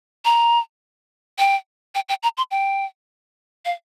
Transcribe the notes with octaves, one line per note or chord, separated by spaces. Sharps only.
A#5
G5
G5
G5
A#5
C6
G5
F5